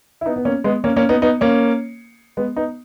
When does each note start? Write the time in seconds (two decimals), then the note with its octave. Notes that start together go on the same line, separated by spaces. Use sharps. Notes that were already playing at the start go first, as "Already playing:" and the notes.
0.21 E4
0.26 B3 D#4
0.36 B3
0.45 A#3 C#4
0.64 G#3 B3
0.84 A#3 C#4
0.96 A#3 C#4
1.09 B3 D#4
1.22 B3 D#4
1.41 A#3 C#4
2.37 G#3 B3
2.56 B3 D#4